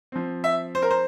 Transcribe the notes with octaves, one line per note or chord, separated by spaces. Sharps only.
F3 C4
E5
C5
A#4
C5